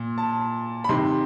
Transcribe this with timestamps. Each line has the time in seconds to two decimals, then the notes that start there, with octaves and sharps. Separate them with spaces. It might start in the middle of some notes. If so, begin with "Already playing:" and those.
Already playing: A#2
0.18 A5
0.84 B5
0.89 C3 D#3 C6